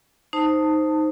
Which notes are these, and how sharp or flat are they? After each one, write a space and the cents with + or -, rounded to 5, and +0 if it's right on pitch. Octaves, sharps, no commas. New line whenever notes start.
D#4 +0 C5 +0 A5 +20